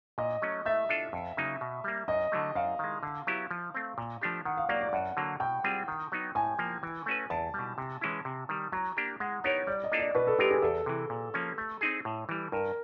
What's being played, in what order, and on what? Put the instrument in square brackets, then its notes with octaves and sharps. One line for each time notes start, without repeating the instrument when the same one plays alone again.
[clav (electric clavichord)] A#2 [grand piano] D#5
[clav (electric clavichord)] F#3 A3 C#4
[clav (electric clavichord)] A3 [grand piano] E5
[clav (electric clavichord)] D4 F4 A4
F2
C#3 F#3 A#3 D#4
B2
G3 A#3
[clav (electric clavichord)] F#2 [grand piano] D#5
[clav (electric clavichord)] D3 F#3 A3
[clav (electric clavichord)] F#2 [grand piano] F5
[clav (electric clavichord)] D#3 G#3
D3
F#3 B3 E4 G4
F3
A3 C4
A#2
F3 A3 D4 G4
[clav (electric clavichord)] D#3 [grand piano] F#5
[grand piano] F5
[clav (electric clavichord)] F#3 A#3 [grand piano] D5
[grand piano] D5
[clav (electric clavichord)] F#2 [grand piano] F#5
[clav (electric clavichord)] D3 F#3 A#3
[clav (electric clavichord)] B2 [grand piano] G5
[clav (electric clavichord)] G3 C4 F4 G#4
D#3
F#3 B3 D#4
[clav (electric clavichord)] A2 [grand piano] G#5
[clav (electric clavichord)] F3 A#3
E3
A3 C#4 F#4 B4
[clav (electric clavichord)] E2 [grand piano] A5
[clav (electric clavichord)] B2 G3
C3
E3 G#3 C#4 E4
C3
D#3 G3
[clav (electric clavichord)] F#3 [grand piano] A#5
[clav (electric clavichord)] A#3 D4 G4
[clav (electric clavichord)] G#3 [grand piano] F#5
[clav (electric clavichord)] B3 D#4 G4 A#4 [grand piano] C#5
[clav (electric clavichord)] G3 [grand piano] D5
[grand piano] D#5
[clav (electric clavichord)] A#3 D4 F4 A4
[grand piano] D5
[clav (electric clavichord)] B2 [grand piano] B4
[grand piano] A4
[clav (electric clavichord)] G#3 C4 F4 A#4 [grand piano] G4
[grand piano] G#4
[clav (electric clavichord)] E2 [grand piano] A4
[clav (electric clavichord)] C3 E3
A#2
F3 A#3 C#4
A3
C4 D#4 G#4
A2
E3 G3
[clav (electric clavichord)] G2 [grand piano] A#4